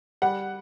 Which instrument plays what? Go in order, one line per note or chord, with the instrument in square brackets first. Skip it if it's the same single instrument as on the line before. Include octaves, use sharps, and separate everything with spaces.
[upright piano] G3 F#5